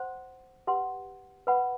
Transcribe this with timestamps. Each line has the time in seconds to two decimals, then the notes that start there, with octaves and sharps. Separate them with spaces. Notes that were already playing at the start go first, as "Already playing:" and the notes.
Already playing: C5 F#5 C6
0.67 G4 B4 F#5 C6
1.47 B4 F#5 B5